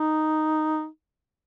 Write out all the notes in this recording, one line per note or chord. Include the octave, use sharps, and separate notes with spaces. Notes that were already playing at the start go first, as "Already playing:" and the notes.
Already playing: D#4